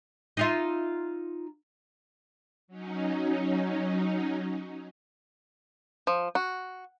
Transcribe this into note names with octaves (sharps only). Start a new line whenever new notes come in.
D#4 F4 E5
F#3 C#4 D#4
F3
F#4